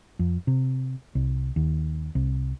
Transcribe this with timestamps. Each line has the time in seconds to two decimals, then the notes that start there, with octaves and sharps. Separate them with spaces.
0.19 F2
0.47 C3
1.15 C2
1.56 D#2
2.15 C2